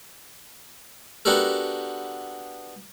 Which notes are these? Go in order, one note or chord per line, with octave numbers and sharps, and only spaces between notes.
B3 D4 F#4 G4 A4 A#4